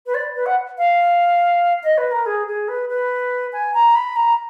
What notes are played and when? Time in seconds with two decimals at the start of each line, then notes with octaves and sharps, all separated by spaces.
0.06 B4
0.14 D5
0.35 B4
0.46 F#5
0.78 F5
1.83 D#5
1.98 B4
2.12 A#4
2.26 G#4
2.47 G#4
2.68 B4
2.89 B4
3.53 G#5
3.74 A#5
3.95 B5
4.16 A#5